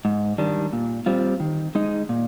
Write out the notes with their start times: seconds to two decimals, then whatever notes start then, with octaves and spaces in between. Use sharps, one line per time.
0.05 G#2
0.38 D#3 G3 D4
0.73 A#2
1.06 G3 C4 F4
1.40 D#3
1.75 G#3 D#4
2.09 A#2